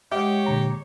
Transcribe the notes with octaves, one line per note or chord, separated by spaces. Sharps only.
G#3 G4 C#5 D#5 E5 F#5
A#2 D3 A#5